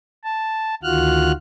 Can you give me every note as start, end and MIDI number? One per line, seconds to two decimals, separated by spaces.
0.24 0.75 81
0.83 1.32 38
0.83 1.32 51
0.83 1.32 65
0.83 1.32 66
0.83 1.32 89
0.83 1.32 90